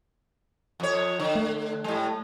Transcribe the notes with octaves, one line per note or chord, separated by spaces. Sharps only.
F2 C#5
D3
A3
A2 G3